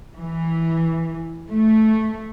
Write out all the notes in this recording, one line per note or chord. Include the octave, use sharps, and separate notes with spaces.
E3
A3